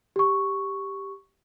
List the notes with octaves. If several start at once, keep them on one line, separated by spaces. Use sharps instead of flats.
G4 C#6